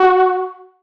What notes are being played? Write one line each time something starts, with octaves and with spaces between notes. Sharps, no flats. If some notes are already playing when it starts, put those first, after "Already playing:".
Already playing: F#4